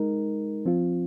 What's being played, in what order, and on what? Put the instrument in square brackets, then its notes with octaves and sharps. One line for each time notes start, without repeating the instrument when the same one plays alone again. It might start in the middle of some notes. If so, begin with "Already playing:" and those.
Already playing: [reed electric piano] G#3 D#4 A#4
F3 C4 F4